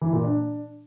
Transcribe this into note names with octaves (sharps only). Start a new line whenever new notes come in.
E3
A#2
D4